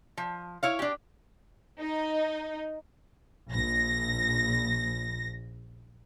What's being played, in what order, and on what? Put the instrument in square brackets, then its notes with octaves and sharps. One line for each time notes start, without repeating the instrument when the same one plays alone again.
[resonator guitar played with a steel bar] F3
E4 C#5 F5
D4 G4
[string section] D#4
A#1 A#6